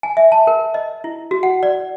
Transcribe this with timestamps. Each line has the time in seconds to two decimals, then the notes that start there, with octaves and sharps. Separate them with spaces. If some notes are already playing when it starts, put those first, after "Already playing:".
0.03 G#5
0.17 E5
0.32 A5
0.47 A#4
0.74 D#5
1.04 E4
1.31 F#4
1.43 F#5
1.63 D5